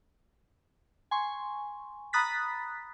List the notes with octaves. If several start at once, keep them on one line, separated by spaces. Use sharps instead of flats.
G#5 C6 C#6
A#5 B5 D#6 F#6 A6 B6